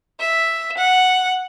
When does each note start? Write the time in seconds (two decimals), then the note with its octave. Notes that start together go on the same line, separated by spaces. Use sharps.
0.20 E5
0.77 F#5